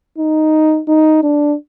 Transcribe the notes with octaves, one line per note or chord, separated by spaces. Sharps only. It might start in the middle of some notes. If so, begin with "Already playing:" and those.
D#4
D#4
D4